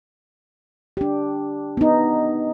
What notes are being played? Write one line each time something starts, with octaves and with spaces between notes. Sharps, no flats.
D4 G4
B3 D#4